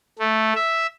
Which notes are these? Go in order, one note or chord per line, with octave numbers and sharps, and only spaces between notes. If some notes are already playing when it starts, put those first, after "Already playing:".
A3
E5